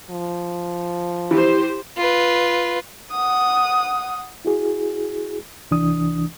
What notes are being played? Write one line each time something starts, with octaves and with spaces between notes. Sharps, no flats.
F3
E3 G4 C5
F4 B4
F#5 D#6
E4 F#4 G#4
C2 E3 D4 D#6